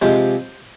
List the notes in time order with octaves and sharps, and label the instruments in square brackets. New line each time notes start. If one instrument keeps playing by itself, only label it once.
[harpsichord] C3 F3 G#3 C4 C5